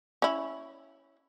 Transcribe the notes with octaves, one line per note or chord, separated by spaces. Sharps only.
C#4 E4